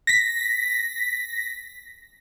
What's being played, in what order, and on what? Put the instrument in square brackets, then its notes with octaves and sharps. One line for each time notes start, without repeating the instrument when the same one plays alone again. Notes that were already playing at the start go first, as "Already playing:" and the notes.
[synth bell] A#6 B6